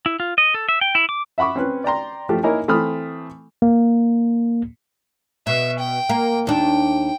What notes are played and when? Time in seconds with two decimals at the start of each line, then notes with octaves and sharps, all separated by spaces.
0.06 E4
0.20 F4
0.38 D#5
0.54 A4
0.69 E5
0.81 G5
0.95 E4
1.09 D6
1.38 E5 F#5 B5 C#6 D6
1.56 C4 C#4 B4
1.84 D5 G5 A#5 C6
2.29 F3 A3 G4
2.43 A#3 D#4 E4 A#4 C#5 G#5
2.68 E3 A3 C4 B5 D#6 F6
3.62 A#3
5.47 B2 E5
5.79 G5
6.09 A#3
6.47 D#2 D4 G5